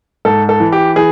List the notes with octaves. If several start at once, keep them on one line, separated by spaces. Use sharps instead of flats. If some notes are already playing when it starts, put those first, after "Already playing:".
G#2 A4
A4
E3
G4
E3 G#4